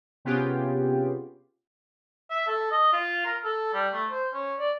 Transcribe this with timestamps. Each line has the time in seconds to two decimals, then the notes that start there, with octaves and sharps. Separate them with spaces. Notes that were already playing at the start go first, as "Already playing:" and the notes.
0.25 C3 B3 C#4 F4 G4 G#4
2.30 E5
2.47 A4
2.71 D#5
2.93 F4
3.25 A#4
3.44 A4
3.74 G3
3.93 A3
4.10 C5
4.34 C#4
4.59 D5